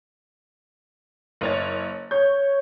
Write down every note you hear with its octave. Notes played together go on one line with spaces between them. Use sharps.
F#1 C#5 A6
C#5 G6